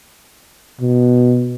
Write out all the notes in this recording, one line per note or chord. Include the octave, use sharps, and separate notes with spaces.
B2